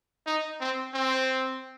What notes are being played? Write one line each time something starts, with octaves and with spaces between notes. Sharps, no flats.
D#4
C4
C4